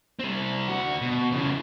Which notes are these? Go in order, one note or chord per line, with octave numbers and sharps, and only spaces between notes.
G3 C4
D2 F#4
B2
C#3 E3